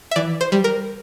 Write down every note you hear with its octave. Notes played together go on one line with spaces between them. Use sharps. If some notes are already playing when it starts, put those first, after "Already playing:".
E5
E3 D5
C5
G3
A#4